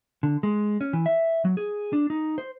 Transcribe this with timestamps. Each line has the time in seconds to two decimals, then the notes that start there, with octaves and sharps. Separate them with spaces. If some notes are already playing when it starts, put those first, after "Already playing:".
0.23 D3
0.43 G#3
0.81 C#4
0.93 E3
1.06 E5
1.45 F#3
1.57 G#4
1.93 D4
2.10 D#4
2.38 C5